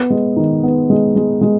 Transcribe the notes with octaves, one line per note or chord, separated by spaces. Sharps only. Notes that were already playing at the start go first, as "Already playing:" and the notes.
Already playing: B3
G#3
D#3
B3
G#3
G#3
G#3